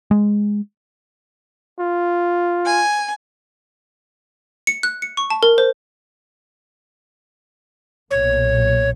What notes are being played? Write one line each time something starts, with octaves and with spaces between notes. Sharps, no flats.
G#3
F4
G#5
C#7
F#6
C#7
C#6
A5
A#4
C5
B1 A#2 C#5